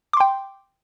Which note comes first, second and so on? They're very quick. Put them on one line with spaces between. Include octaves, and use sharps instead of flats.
D6 C6 G5